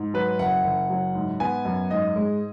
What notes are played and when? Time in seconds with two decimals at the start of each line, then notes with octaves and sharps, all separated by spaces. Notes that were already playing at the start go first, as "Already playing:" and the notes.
Already playing: G#2
0.14 F#3 B4
0.39 F#1 F#5
0.64 F#1
0.90 F#3
1.15 G#2
1.40 B3 G#5
1.65 F#2
1.91 G#2 D#5
2.16 G#3